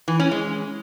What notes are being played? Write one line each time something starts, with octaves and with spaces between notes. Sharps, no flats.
E3
C#4
G#3